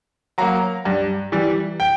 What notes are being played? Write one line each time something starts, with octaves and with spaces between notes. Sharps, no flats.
F#3 A#3 A#5
G2
E3 G3
G5